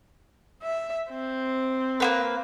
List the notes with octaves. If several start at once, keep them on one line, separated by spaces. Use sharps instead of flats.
E5
C4
A#3 B3 B4